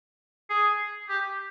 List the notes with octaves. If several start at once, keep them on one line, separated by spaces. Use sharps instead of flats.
G#4
G4